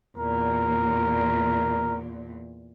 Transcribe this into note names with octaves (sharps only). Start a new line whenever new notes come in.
E2 A#2 A#4